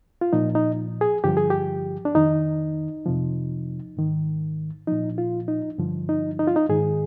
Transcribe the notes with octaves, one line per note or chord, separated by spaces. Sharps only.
F4
A#2 F3 D#4
D#4
G#4
G2 D3 F3 G4
G#4
G4
D4
F2 D#3 D#4
F2 C3 F3
G#2 D#3
A#2 F3 D#4
F4
D#4
G2 D3 F3
D#4
D#4
F4
D#4
G#2 D#3 G#4